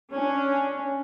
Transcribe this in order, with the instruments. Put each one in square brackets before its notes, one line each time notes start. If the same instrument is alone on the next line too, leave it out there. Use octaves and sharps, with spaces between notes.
[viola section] C#4 D4